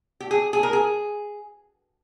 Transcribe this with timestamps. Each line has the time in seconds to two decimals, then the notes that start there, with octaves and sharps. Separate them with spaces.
0.20 G4
0.31 G#4
0.53 G#4
0.63 A#4
0.73 G#4